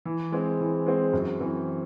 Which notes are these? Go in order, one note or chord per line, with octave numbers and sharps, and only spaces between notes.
E3
G#3 C4
E3
G#3 C4
F#2
E3 C4